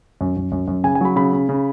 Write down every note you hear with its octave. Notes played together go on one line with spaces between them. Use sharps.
F#2
F#2
F#2
F#2
C#3 G#5
G#5
F#3 B5
C#3 B5
C#3
C#3